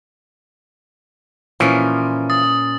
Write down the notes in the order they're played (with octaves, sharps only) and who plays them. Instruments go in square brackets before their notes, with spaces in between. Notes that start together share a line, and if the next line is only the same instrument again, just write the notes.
[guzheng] A#2 C#4 [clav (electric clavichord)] E3 F3
[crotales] D#6 A6